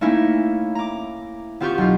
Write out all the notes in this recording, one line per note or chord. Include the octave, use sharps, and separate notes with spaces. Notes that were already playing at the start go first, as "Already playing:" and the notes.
A3 A#3 C#4 D#4 E4
A#5 D6
B3 C4 F4 G4 C#6 G6
B1 F4